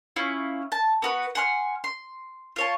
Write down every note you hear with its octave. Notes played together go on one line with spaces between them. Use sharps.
C#4 E4 F4
A5
B3 F#4 B4
F#5 G#5 C6 F6
C6
F4 C#5 A5